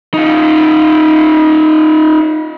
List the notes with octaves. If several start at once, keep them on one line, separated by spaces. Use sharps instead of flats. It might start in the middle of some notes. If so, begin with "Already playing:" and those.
D#4 F4